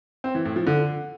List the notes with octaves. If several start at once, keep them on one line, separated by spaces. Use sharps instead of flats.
C4
E3
A2
F3
D3